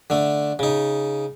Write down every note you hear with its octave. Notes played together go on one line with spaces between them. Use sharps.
D3 A3
C#3 D#4